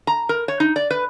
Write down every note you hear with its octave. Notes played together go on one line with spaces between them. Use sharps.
A#5
A#4
C#5
D#4
D5
B4